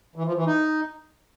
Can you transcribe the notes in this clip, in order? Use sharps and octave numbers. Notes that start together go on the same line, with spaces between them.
E3
F3
E3
D#4